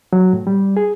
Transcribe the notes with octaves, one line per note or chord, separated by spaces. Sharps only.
F#3
A2
G3
G#4